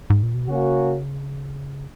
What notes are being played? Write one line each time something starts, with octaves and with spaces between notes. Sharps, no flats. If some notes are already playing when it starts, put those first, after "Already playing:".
G#2
A#2
B2
C#3 A#3 C#4 F#4